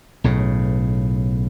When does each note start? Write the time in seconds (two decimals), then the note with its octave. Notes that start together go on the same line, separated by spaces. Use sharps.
0.24 B1 A2 C#3